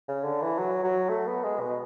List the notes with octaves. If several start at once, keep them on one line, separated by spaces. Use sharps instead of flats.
C#3
D3
E3
F#3
F#3
A3
B3
G#3
B2